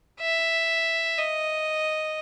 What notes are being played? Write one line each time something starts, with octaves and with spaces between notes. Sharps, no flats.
E5
D#5